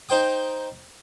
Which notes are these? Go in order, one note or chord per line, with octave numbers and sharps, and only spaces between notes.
D#4 C5 G5 D#6